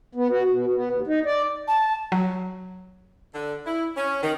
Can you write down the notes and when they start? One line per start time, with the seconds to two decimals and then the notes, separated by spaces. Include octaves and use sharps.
0.15 B3
0.31 F#4
0.50 B2
0.74 B3
0.91 D#2
1.07 D#4
1.26 D5
1.68 A5
2.12 F#3
3.34 D3
3.66 E4
3.97 C#4
4.23 D#3